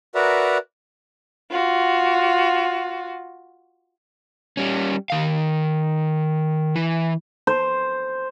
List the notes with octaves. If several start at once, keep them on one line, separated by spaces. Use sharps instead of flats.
F#4 A#4 B4 D5 E5 A#5
F4 F#4
G3 C#4
D#3 F5
E3
C5